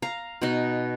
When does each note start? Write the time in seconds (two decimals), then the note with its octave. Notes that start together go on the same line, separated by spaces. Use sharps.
0.02 F5 A#5
0.42 B2 D#4